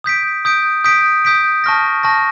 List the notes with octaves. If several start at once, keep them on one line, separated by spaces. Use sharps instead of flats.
D#6 G6 B6 D7
D#6 G6 B6 D7
D#6 G6 B6 D7
D#6 G6 B6 D7
A5 C#6 F6 A#6
A5 C#6 F6 A#6